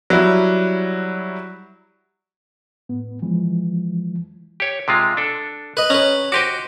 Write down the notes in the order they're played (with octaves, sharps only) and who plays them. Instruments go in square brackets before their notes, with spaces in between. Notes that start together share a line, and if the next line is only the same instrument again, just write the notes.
[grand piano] F#3 G3 E4
[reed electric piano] A2 B3
E3 F3 G#3
[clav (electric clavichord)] G4 C#5
C3 G#3 F4
D4 A4
[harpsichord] B4 D#5
[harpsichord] C#4 B4 [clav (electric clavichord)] A#5
[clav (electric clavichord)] F#4 G4 D#5 [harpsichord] C5 D6